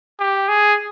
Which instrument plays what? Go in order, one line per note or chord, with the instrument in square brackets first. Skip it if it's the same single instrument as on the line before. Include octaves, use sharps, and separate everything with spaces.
[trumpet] G4
G#4